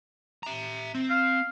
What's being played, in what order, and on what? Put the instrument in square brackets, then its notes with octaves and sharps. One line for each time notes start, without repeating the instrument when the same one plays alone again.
[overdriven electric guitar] E5 A#5
C4
[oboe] F5